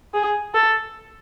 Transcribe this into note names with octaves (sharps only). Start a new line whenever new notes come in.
G#4
A4